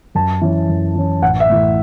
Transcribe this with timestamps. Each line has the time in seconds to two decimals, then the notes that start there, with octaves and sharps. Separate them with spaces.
0.15 F#2 A5
0.42 E3 C#4
0.69 F#2
0.95 E3 C#4
1.22 A1 F#5
1.40 E5
1.50 A2 E3